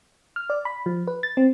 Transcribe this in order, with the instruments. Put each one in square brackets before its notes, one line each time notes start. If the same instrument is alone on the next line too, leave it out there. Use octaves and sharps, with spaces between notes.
[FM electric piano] F6
D5
B5
F3
B4
A6
C4